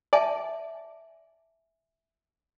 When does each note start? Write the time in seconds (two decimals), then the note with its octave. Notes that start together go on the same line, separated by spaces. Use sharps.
0.13 D5 E5 G#5 A5